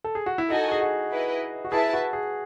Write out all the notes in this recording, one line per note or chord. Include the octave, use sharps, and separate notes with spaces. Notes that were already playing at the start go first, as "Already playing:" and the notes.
A4
G#4
F#4
E4
D#4 F#4 A4 D#5 G#5
G#4
F#4
E4 B4 D#5
F#4
E4 G#4 B4 E5 A5
F#4
G#4